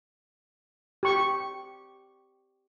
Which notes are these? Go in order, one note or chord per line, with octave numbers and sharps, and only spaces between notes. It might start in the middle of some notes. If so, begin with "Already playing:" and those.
G4 C#6